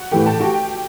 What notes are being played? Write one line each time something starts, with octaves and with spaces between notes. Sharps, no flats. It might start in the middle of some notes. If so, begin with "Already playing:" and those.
Already playing: F#4 F#5
A2 E3 A3 G4 G5
A4 A5
F#4 G4 G5